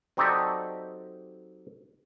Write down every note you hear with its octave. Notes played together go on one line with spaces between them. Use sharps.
F#3 C4 D#4 G4 A4 D5